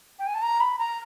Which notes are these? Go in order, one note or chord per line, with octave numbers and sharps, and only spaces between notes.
G5
G#5
A5
A#5
B5
A#5